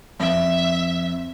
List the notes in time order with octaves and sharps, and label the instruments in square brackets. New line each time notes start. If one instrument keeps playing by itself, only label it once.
[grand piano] F2 [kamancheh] E5